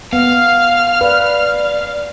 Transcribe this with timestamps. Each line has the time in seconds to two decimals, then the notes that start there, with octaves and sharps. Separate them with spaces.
0.13 B3 F5 F6
1.01 B4 D5